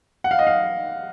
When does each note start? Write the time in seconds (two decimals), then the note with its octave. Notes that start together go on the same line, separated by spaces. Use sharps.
0.24 F#5
0.31 F5
0.39 D#5
0.47 F5